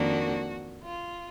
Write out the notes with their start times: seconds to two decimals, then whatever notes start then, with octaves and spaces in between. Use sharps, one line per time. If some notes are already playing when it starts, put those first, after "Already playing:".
Already playing: F2 D#3 A#3 D4 F#4
0.84 F4